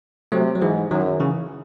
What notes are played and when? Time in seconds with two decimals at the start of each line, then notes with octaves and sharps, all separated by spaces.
0.32 C3 F#3 A3
0.55 F#3
0.61 G#2 E3 G#3
0.90 F#2 D#3 F#3
1.20 C#3 E3